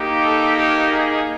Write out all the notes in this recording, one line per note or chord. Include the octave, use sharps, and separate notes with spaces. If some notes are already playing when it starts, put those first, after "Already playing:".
Already playing: A#3 D#4 G4
A4
G4
G#4